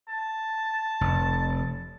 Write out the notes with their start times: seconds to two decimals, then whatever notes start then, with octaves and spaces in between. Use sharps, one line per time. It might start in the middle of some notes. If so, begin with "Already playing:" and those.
0.08 A5
1.01 F1